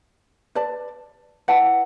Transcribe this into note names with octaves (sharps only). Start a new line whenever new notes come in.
B4 D5 A5
E4 B4 F#5 A5